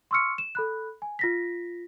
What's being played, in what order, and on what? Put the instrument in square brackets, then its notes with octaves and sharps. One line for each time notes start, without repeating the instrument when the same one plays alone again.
[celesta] C6 C#6 E6 F6 C#7
E7
A4 B5 F#6
G#5
F4 A#6 B6